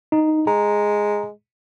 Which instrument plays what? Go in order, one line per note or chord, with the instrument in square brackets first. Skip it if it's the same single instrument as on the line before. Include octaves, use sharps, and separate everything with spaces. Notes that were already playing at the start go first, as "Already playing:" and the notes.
[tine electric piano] D#4
[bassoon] G#3 [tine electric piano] A#5